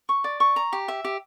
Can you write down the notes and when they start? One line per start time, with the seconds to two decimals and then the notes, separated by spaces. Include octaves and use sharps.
0.09 C#6
0.24 D5
0.40 C#6
0.56 A#5
0.73 G4
0.88 E5
1.05 G4